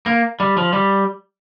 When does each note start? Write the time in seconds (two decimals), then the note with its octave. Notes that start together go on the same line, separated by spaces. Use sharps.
0.06 A#3
0.40 G3
0.57 F3
0.73 G3